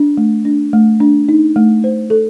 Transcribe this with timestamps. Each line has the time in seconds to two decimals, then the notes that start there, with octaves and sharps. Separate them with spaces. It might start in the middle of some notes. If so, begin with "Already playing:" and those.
Already playing: D4
0.17 A3
0.45 D4
0.73 A3
1.00 D4
1.29 D#4
1.56 A3
1.84 C5
2.10 A4